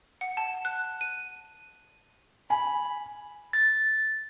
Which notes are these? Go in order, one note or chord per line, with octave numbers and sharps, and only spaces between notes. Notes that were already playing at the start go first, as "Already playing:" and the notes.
F#5
A5
F#6
D#7
G#5 B5
A6